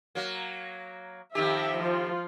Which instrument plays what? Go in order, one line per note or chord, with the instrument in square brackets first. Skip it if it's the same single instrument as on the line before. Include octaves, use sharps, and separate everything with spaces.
[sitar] F#3 A#3
[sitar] F2 D#3 G4 [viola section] E5
[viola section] F3 F4